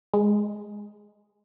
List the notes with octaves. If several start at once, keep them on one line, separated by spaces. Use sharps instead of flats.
G#3